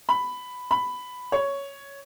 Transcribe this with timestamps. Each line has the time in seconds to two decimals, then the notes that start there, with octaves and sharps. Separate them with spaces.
0.09 B5
0.71 B5
1.32 C#5